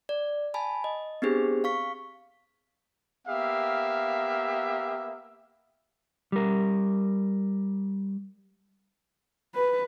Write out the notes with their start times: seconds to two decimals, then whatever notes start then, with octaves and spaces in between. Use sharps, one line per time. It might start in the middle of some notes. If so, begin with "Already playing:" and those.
0.09 D5
0.54 G#5 A5 B5
0.84 D#5
1.22 B3 C4 D4 G4 G#4 C5
1.64 F5 C#6 B6
3.28 A#3 B3 G4 E5 F5
6.32 G3 A#4
9.55 B4